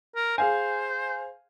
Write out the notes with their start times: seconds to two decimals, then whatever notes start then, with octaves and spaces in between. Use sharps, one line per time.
0.16 A#4
0.38 G#4 C5 F5 G#5